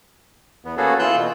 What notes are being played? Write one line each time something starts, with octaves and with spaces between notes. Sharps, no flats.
E2 B3
A#3 B3 C#4 F#4 G#4 A4
E3 F4 E6 F#6 G6
B2